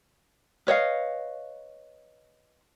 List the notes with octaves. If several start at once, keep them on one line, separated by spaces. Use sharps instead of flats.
B4 C#5 D#5 F5